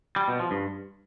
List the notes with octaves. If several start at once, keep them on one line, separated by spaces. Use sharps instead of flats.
G3
B2
F3
G2